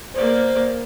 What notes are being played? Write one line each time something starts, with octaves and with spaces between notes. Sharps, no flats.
A#3 C5 D5